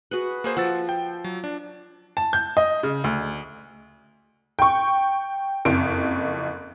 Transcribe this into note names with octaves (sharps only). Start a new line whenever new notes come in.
F#4 G#4 B4
A#3 G#4 C5
F3 F#5 E6 A6
G5
F#3
D4
A5
G6
D#5
C#3
D2
G5 C#6
F#1 F2 D7